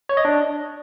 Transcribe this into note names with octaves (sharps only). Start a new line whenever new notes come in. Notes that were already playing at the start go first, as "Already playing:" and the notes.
C#5
D#5
D4